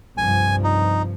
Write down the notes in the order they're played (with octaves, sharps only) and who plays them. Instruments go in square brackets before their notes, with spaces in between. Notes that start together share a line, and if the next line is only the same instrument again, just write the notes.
[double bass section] C2 G2 F3 [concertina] G#5
[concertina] D#4